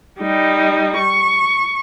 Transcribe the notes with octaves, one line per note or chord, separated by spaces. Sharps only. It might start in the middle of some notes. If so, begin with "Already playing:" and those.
G3 D#4
C#6